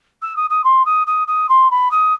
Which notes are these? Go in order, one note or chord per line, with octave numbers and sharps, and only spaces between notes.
E6
D#6
D#6
C6
D#6
D#6
D#6
C6
B5
D#6